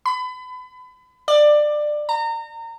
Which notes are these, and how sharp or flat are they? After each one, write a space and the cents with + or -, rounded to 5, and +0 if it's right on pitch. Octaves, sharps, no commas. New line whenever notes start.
B5 +30
D5 +20
A#5 -30